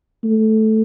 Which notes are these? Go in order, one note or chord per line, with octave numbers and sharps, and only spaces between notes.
A3